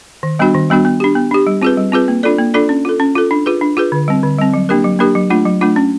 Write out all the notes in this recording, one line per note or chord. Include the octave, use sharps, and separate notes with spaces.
D#3
G3 B3 D4 F#4
D#3
G3 B3 D4 F#4
B3
D4 G4
B3
D4 G4
G3
C4 F4 G#4 B4
G3
C4 F4 G#4 B4
A#3
D4 F4 A4 D5
A#3
D4 F4 A4 D5
C#4
F4 A4
C#4
F4 A4
D4
F4 G#4 B4
D4
F4 G#4 B4
D3
G3 C4
D3
G3 C4
F#3
A#3 D4 G4 A#4
F#3
A#3 D4 G4 A#4
F#3
A3 D4 F4
F#3
A3 D4 F4
C#4